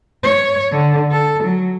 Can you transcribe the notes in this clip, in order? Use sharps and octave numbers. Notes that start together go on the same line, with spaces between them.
C#5
D3
A4
F#3